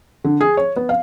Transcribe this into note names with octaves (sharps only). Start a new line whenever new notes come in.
D3
G#4
C#5
B3
F5